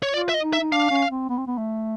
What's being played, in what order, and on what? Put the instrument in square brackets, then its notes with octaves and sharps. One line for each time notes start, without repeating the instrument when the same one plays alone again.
[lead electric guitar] C#5
[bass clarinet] F4 [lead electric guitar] D5
[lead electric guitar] E5
D#5
[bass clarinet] D#4
[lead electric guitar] E5
[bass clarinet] D#4
[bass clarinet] D4 [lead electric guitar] F5
[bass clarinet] C#4
C4
B3
C4
B3
A3